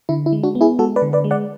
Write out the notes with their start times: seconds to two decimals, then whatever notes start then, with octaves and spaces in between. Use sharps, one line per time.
0.09 D3 E4
0.26 E4
0.33 G#3
0.43 D4 F#4
0.55 B3
0.61 E4 G#4
0.79 G#3 F#4 A4
0.96 B4 D5
1.02 D3
1.13 B4 D5
1.24 G#3
1.31 D5 F#5